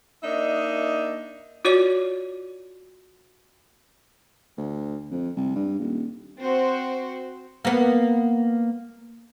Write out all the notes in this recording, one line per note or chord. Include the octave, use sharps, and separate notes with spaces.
A#3 D4 D#4 D#5 E5
F4 F#4 C#5 D5 D6
D2
F2
C2
G2
D#1
C4 F#4 C5
A#3 B3